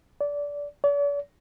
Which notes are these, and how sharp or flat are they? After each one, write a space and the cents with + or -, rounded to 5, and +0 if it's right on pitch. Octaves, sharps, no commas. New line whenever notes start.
D5 -20
D5 -45